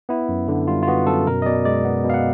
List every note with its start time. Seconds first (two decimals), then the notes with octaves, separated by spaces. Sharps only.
0.09 B3 E4
0.29 F#2
0.48 D3
0.68 G3 F4
0.83 F4
0.87 B3 F#4
1.07 F#2 A4
1.27 B2 A#4
1.42 D#5
1.46 B2 D5
1.65 G#3 D5
1.85 B3
2.04 B2
2.10 F5
2.14 F#5